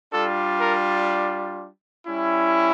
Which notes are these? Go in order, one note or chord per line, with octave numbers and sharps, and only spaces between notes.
G3 D4 F4 A4
A#4
G3 C#4 E4